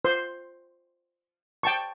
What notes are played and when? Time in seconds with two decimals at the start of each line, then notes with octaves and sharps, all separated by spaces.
0.05 C5 C6
1.63 G5 A5 C#6